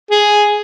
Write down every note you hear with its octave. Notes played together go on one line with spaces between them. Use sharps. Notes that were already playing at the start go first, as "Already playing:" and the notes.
G#4